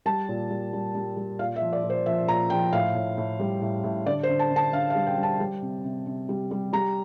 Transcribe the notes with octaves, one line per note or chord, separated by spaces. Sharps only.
G3 A5
A#2
G3
G3
G3
G3
A#2 F5
E5
F3
D5
A#2
C5
F3 E5
A#2 A#5
F3 G5
A2 F5
A2
A2
G3
A2
A2
D3 D5
C5
D3
A5
D3
A5
D3 F5
F5
G3
G5
G3
A5
G3
C3
C3
C3
G3
G3
G3 A#5